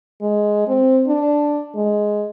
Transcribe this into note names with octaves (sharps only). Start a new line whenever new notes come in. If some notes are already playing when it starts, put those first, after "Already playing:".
G#3
C4
D4
G#3